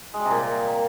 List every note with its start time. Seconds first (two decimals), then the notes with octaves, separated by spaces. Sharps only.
0.14 G#3
0.19 G3
0.25 C3
0.31 A#2